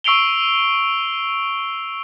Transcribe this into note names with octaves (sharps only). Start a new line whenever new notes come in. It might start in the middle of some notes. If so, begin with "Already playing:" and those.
C#6 E6 C7 D7 F7 G7